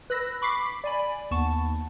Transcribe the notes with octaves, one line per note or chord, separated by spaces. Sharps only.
B4 B5 E6 A#6
B5 C#6 D6 B6 C7
D5 G#5 B5
D#2 B3 A5 C#6